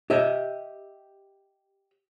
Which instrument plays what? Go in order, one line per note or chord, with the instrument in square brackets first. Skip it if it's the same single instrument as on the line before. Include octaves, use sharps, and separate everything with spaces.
[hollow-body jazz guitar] G4 D#5 E5